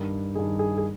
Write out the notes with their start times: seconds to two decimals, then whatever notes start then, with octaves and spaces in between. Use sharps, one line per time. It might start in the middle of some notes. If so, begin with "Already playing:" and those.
Already playing: G2 D#3 A#4
0.35 G2 D#3 G#4
0.59 G#4
0.78 G#4